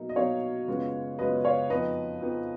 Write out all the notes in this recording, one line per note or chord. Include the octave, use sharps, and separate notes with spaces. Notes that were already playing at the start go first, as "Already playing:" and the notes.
Already playing: B2 F#3 A#3 D#4
D#5
B2 F#3 A#3 D#4 C#5 F5
F#2 C#3 G#3 B3 F4
F#2 C#3 G#3 B3 F4 B4 D#5
C#5 F5
F2 F3 B3 D#4 B4 D#5
F2 F3 B3 D#4